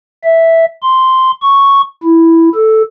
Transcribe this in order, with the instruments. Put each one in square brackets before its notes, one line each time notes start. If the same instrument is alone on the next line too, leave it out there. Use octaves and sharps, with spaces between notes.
[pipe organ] E5
C6
C#6
E4
A4